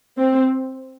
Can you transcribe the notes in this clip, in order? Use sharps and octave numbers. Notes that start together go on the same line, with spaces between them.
C4